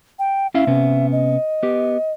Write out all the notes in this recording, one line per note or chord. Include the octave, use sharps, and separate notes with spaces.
G5
C#4 E4 E5 F5
C3 B3 C#4
D#5
B3 G4